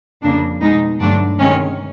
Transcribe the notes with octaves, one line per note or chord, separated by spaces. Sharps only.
F2 C#3 F3 A#3 D4
B2 G#3 D#4
G2 D3 F#3 A3 D4
C3 D#3 G#3 C#4